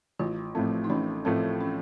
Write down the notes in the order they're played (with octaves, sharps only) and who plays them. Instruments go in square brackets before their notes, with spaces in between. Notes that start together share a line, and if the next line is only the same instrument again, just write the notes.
[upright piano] A1 [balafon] F4
[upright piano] A2 F3 A3 [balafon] C4
[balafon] D#4
[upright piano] A1 [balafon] C#4
[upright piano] A2 F3 A3 [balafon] C4
[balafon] C#4